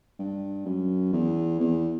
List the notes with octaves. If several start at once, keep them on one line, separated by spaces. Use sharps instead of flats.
G2
F#2
E2
E2